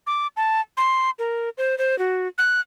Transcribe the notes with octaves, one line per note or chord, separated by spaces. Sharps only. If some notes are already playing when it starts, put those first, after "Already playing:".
D6
A5
C6
A#4
C5
C5
F#4
F#6